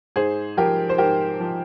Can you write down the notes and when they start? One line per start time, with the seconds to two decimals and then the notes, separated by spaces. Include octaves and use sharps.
0.16 G#2 G#4 C5
0.57 F3 G4 A#4
0.89 C5
0.98 G#2 G4 A#4
1.40 F3